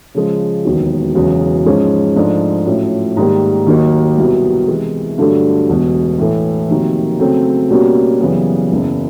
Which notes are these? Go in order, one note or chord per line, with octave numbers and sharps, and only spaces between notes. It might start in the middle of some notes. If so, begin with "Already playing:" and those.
C#3 F3 G#3
E1 D#2 D#3 F#3 B3
E1 E2 C#3 F#3
G#2 F3 G#3 C#4
G#2 F3 A3 D4
A2 F#3 A3 C#4 F4
G#2 D#3 G3 A#3
D#2 D#3 F#3 A#3 D#4
C2 B2 F#3 B3
C3 E3 G#3
G2 D3 F#3 A3
E1 E2 B2
A2 E3 A3
F2 C3 D#3 F#3 A#3
C#3 F#3 A3 C4
B2 G3 A#3 C#4 F#4
F#2 C#3 E3 G3 B3
F#1 E2 C#3